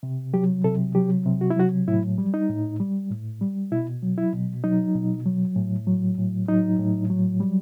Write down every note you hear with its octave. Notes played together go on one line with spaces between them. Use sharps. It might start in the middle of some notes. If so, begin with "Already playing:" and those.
C3
F#3 G4
C3 A4
F#3 G4
C3
F#4
E4
F#3 F#4
A2 E4
G3
D#4
A2
G3
A2
G3
B2 E4
F#3
E4
B2
F#3 D#4
B2
F#3
A2
F#3
A2
F#3 D#4
A2
F#3
G3